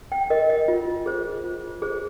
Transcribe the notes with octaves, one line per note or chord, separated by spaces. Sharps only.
G5
A#4 D#5
D#5
F4
G#4 C5
F4
G#4 C5